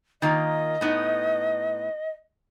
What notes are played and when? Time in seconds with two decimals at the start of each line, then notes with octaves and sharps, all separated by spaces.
0.22 D#3 A#3 F4 D#5
0.81 A2 B3 D#4